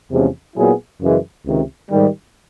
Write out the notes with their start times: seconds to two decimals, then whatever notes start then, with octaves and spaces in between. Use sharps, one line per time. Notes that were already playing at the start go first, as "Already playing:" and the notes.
0.11 E2 C3 F3 G#3 C#4
0.56 A#2 F#3 B3 E4 G#4
1.01 F#2 C#3 E3 G#3
1.45 C#2 C3 D#3
1.90 G#2 D#3 G3